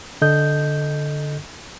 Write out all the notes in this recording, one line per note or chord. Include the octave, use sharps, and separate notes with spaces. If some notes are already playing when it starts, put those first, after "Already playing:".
D3 A4 D#5 G6